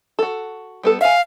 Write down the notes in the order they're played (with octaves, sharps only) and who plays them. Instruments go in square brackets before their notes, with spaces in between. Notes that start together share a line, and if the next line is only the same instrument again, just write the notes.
[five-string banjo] F#4 A4
G3 B3 A4
[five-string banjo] E5 G#5 [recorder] F5